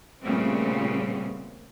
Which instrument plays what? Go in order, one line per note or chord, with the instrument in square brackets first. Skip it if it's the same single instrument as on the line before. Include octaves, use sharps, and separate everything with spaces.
[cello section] A#2 C#3 G3 A3 B3 C4